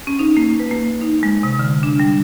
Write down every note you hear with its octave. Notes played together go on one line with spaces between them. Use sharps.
C#4
D#4
A#3
B4
A#3
D#4
G#3
C3
D3
D4
G3